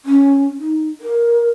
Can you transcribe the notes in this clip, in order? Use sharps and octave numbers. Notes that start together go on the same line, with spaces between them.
C#4
D#4
A#4